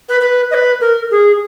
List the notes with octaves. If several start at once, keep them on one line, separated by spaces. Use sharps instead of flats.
B4
B4
D#5
B4
A#4
G#4